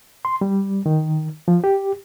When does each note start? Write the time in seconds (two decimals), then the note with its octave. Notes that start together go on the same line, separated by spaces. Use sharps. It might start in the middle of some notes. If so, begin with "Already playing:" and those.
0.25 C6
0.41 G3
0.86 D#3
1.48 F3
1.64 G4